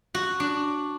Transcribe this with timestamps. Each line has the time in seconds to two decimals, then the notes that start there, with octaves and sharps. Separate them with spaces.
0.14 F#4
0.40 D4